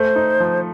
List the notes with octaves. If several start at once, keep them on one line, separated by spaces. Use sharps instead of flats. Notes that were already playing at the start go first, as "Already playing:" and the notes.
Already playing: A3 C5
D#4
F3